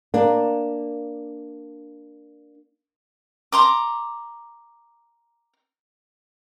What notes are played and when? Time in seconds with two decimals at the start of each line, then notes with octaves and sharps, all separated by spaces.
0.14 A#3 D4
3.52 A#5 C6 D6